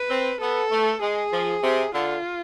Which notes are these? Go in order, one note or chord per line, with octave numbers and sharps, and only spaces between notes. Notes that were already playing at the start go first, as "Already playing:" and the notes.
Already playing: B4
C4
B3 A4
A3
G#3 G#4
F3
C3
D3 F4